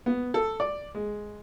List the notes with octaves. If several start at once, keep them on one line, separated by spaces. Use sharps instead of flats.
B3
A4
D5
G#3